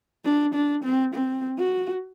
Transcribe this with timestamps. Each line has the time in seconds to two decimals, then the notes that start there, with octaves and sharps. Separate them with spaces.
0.25 D4
0.54 D4
0.84 C4
1.14 C4
1.58 F#4